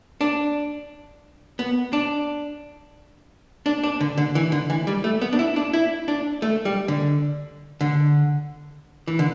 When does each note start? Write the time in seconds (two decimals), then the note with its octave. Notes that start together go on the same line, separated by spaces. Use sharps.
0.21 D4
1.59 B3
1.93 D4
3.66 D4
3.83 D4
4.01 D3
4.17 D3
4.35 E3
4.52 D3
4.70 E3
4.87 G3
5.04 A3
5.21 B3
5.33 D4
5.39 E4
5.56 D4
5.73 E4
6.08 D4
6.42 A3
6.65 G3
6.88 D3
7.81 D3
9.08 E3
9.19 D3